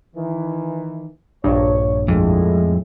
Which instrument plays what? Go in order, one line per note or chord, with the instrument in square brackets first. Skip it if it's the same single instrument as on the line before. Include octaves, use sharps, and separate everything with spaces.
[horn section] D#3 E3
[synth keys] A#1 G2 [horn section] C#5
[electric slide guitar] F2 [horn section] A2 G#3